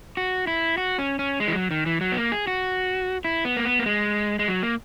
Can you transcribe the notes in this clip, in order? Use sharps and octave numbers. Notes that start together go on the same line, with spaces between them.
F#4
E4
F#4
C#4
C#4
G#3
E3
F#3
D#3
E3
F#3
B3
A#3
G#4
F#4
E4
B3
A#3
B3
A#3
G#3
G#3
F#3
A#3